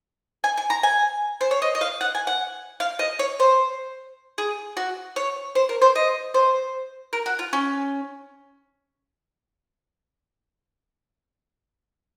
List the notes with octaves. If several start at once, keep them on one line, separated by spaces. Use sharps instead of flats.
G#5
G#5
A#5
G#5
C5
C#5
D#5
D#5
F5
F#5
G#5
F#5
F5
D#5
C#5
C5
G#4
F#4
C#5
C5
A#4
C5
D#5
C5
A#4
F#4
F4
C#4